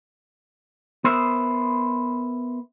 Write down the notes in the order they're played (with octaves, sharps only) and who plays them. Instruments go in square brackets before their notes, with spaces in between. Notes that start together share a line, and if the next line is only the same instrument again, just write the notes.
[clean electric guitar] B3 A#4 C5 E5